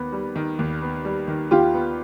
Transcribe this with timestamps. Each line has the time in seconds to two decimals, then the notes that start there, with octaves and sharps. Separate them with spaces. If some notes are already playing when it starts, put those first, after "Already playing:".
Already playing: D#2 B3
0.13 G3
0.36 D#3
0.59 D#2
0.82 B3
1.05 G3
1.28 D#3
1.51 D#2 F4 G4
1.74 B3